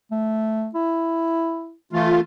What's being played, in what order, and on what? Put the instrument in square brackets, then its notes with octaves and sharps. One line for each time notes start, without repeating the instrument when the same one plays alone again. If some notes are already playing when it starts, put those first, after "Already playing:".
[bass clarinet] A3
E4
[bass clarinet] E3 [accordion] A3 F4